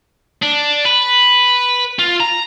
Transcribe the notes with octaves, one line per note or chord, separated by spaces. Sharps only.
D4
B4
F4
A#5